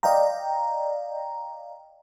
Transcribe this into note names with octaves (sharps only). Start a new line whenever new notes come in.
D5 D#5 F5 G5 A#5